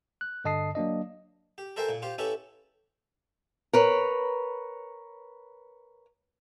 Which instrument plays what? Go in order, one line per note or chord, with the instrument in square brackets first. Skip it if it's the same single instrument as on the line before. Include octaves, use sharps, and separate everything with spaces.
[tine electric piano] F#6
G2 D3 D#5 A5 D#6 C7
F#3 A#3 D4 D#5
[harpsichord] G4
A4 A#4 C5 E5 G5 G#5
A#2
F4 G4 C5
C#4 E4 G4 A4 B4 C#5
[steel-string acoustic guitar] A#4 B4 C#5